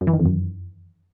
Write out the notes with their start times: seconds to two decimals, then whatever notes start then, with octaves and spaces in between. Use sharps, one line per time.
0.01 F#2
0.07 E3
0.13 D#3
0.19 F2
0.26 F#2